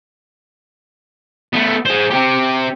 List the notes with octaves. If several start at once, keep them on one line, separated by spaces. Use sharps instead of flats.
A3 B3
G#4 C5
C4 G4